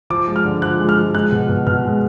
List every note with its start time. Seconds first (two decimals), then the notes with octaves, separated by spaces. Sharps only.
0.10 F3 D6
0.28 G#3
0.36 F6
0.45 D3
0.62 F3 F#6
0.80 G#3
0.89 F6
0.97 F3
1.14 G#3 F#6
1.32 B2
1.49 B2
1.67 B2 F6
1.85 G#3